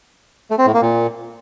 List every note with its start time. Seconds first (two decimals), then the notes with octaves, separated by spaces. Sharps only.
0.51 A3
0.58 C4
0.66 A2
0.74 A#3
0.82 A#2